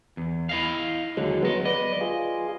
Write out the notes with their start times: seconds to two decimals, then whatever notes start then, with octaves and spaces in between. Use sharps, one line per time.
0.17 E2
0.49 E4 D#5 F5
1.17 D#2 D3 F#3 G#3
1.43 F#3 B3 D#5
1.65 B4 D5 D#5
2.01 F4 G#4